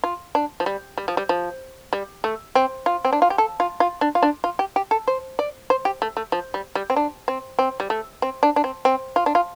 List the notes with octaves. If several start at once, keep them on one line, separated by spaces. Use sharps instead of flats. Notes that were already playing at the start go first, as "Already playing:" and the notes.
F4
D4
F3
G3
G3
F3
G3
F3
G3
A3
C4
F4
C4
D4
F4
G4
A4
F4
F4
D4
F4
D4
F4
G4
G4
A4
C5
D5
C5
G4
A3
A3
F3
G3
G3
C4
D4
C4
C4
G3
A3
C4
D4
D4
C4
C4
F4
D4
F4